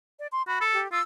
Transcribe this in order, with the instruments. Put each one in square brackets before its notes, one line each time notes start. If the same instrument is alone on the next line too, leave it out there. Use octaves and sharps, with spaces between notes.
[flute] D5
C6
[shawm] F#4 [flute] B5
[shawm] A4
[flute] G4
[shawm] F4 [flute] E6